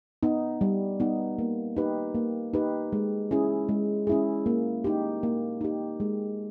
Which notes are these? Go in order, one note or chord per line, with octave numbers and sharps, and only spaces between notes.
B3 D#4
G3
B3 D#4
A#3
D#4 G4 B4
A#3
D#4 G4 B4
G#3
C#4 E4 G#4
G#3
C#4 E4 G#4
A#3
D#4 G4
A#3
D#4 G4
G#3